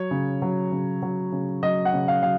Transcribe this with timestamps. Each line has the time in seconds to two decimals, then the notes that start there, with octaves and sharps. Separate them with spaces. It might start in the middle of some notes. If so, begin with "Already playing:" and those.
Already playing: F#3 C#5
0.11 C#3
0.42 F#3
0.72 C#3
1.02 F#3
1.32 C#3
1.63 F#3 D#5
1.85 F#5
1.93 C#3
2.08 F5
2.23 F#3 F5